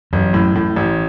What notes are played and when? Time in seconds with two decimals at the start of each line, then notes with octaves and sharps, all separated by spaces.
0.13 A1 F#2
0.34 A2
0.55 A2
0.76 A1